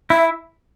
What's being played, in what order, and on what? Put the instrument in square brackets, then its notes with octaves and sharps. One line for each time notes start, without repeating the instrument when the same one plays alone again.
[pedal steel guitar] E4 [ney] E5